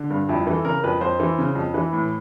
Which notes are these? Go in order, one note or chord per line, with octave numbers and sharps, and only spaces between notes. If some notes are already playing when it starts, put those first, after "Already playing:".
Already playing: D3
G2
F2 E4
E3 A4
C#3 A#4
F2 B4
F2 C5
E3
C#3
F2
E3 B4
A2